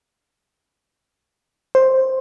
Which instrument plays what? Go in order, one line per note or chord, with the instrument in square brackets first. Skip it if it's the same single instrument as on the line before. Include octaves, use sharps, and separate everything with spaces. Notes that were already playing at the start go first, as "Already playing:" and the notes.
[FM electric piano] C5